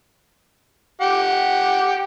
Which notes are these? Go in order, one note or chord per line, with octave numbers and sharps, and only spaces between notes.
G4 F#5